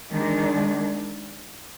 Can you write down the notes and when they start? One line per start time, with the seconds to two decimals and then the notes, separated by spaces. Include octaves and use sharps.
0.10 D#3 G#3 D4